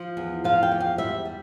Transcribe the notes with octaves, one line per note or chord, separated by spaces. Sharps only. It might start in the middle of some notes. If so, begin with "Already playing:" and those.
Already playing: F3
E2
F3 F5
G5
E2
F5
G3 E5
G3